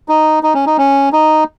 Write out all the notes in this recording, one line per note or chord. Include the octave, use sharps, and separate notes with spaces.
D#4
D#4
C#4
D#4
C#4
D#4